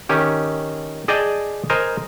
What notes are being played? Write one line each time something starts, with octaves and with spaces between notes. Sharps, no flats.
D#3 C#4 G4
G#4 D5 D#5 G5 A5
A#4 C5 D#5 G#5